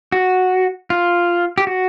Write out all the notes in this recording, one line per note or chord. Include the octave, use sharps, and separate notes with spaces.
F#4
F4
G4
F#4